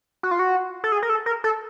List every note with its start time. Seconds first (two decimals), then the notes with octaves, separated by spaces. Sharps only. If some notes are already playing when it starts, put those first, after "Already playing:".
0.23 F#4
0.31 F4
0.39 F#4
0.84 A4
0.92 G#4
1.03 A#4
1.10 A4
1.26 A#4
1.44 A4